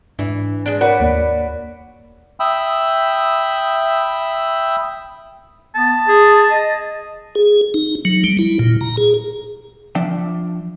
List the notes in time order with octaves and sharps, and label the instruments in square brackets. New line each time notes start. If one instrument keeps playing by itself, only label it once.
[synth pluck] G#2 D4 [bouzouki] E3
[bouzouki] G#3 D4
[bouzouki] F#4 B4 D5 [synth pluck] A#4 C#5 F#5
[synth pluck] D#2 A#3
[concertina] E5 G5 B5 D#6 E6
[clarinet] B3 [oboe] A5
[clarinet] G#4
D#5
[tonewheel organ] G#4
D#4
F#3
G3
E4
A#2
A#5
G#4
[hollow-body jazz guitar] F3 D4 E5 G5